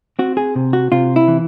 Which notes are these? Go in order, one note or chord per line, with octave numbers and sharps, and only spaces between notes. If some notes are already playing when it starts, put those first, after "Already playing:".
C4 F#4
G#4
C3
F#4
C3 F4
E4
E3